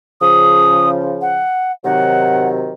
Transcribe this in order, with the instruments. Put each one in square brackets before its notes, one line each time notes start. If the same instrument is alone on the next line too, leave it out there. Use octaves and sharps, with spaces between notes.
[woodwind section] C#3 F3 [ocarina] D#6
[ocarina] F#5
[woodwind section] C3 D#3 F#3 [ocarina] F#5